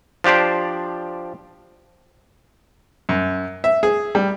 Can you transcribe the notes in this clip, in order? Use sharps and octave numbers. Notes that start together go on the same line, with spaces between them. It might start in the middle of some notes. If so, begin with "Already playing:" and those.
F3 D4 G4 C5 D5
F#2
E5
G#4
G3